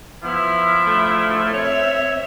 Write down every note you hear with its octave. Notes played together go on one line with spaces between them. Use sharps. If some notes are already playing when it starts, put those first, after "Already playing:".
F3 B3 E4
A3
C4 C#5 E5